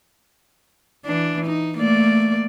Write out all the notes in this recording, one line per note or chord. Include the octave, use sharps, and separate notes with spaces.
E3 D4
D#4
A3 A#3 D5